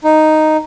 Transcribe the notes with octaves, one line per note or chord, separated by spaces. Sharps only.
D#4